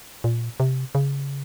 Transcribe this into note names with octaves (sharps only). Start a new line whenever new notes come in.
A#2
C3
C#3